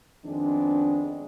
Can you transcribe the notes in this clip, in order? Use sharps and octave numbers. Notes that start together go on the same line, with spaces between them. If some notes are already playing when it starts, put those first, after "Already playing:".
F2 D#3 G#3 B3 C4 D4